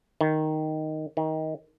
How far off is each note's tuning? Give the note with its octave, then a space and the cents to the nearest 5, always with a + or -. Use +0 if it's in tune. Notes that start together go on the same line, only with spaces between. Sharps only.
D#3 +0
D#3 +20